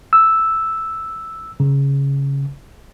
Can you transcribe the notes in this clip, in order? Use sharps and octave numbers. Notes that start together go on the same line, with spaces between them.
E6
C#3